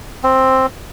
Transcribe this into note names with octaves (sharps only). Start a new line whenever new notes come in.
C4